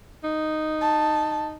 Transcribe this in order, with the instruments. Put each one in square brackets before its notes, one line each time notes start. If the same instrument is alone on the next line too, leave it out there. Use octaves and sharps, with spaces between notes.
[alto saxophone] D#4
[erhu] A5